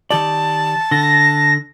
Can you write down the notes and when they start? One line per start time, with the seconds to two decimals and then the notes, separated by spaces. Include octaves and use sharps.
0.11 D#3 G4 D5 A5
0.91 D3 A#6